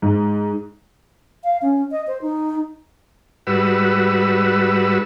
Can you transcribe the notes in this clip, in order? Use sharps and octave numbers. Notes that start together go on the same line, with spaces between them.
G#2
F5
C#4
D#5
C5
D#4
G#2 G3 F#4 B4 E6